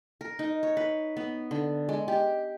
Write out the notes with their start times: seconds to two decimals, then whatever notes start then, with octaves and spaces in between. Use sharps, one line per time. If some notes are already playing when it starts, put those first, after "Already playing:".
0.21 A#4
0.39 D#4
0.63 C#5
0.77 B4
1.17 B3
1.51 D3
1.89 G#3
2.08 G4